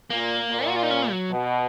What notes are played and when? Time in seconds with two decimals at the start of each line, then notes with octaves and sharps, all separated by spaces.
0.10 A#2 A#3
0.51 A#2
0.68 F#4
0.76 F4
0.83 D#4
0.91 C#4
1.10 F#3
1.30 B2